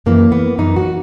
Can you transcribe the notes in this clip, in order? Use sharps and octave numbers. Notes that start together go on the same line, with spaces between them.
F#2 E3 A#3
B3
F#2 E3 D#4
F#4